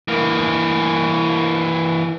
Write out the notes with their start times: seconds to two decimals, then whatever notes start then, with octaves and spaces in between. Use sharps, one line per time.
0.08 E3 A#3